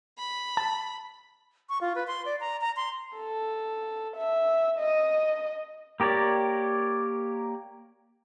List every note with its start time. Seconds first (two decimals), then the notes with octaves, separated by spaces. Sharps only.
0.19 B5
0.57 A5
1.69 C#6
1.81 F4
1.95 B4
2.07 C6
2.25 D5
2.40 A#5
2.61 A#5
2.76 C6
3.17 A4
4.16 E5
4.79 D#5
6.00 A#3 G4 A#4 C#5 D5